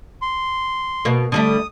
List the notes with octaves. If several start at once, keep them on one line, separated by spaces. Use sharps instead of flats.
C6
B2 A#3
D3 G3 A3 D#6